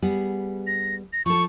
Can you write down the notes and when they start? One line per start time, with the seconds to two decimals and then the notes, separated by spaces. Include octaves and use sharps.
0.02 G3 B3 G#4
0.67 A#6
1.13 A#6
1.26 F3 A4 C#6